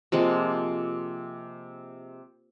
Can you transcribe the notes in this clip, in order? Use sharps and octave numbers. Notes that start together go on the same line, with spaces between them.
C3 F3 G#3 A#3